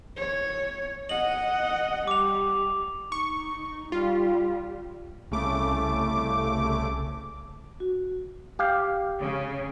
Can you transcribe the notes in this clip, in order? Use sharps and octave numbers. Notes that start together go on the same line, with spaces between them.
C#5
D#5 F#5 F#7
G3 D6 F7
D#4 C#6
G3 F4
C2 C#3 A3 D6
F#4
G4 F5
C#3